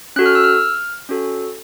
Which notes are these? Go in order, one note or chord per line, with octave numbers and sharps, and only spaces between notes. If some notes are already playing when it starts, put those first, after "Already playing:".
C#4 F#4 A4 F#6
F6
E6
F6
C#4 F#4 A4